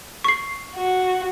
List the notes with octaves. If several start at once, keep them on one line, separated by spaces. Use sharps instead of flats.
C#6 C7
F#4